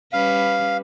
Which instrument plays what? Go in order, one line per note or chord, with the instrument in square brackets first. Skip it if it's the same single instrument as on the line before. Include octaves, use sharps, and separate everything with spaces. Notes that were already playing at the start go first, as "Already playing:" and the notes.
[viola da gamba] G3 C#4 B4 [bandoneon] F5